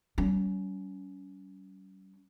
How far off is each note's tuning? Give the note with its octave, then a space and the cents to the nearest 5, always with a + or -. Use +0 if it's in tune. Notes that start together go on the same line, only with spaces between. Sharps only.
G3 -40 C#4 +25